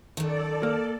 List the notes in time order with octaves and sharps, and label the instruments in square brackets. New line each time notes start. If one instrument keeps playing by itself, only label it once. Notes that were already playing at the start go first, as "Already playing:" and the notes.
[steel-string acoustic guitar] F#2 D#3 [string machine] A4 D5
[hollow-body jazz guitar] A#3